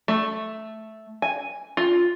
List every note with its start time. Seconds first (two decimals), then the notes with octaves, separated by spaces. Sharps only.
0.08 A3
1.22 G#5
1.77 F4